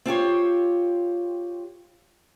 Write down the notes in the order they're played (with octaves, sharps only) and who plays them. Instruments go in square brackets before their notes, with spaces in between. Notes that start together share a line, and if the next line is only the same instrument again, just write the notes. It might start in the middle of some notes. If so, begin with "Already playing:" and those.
[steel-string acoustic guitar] C4 F4 G4 C#5